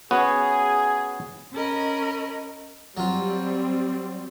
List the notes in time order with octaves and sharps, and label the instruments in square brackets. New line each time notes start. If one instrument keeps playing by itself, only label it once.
[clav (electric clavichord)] B3 C#4 F#4 [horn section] G#4
[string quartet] C#4 A#4 D#5 B5
[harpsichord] F#3 F4 [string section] G3 C4